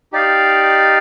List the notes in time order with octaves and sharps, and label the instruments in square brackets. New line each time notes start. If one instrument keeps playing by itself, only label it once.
[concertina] D#4 G4 D5 F5